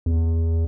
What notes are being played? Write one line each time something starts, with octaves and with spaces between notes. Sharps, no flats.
E2